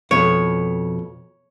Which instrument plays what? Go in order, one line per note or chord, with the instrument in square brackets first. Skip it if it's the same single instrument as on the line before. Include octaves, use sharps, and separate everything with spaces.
[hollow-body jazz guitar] F2 B2 [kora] C#5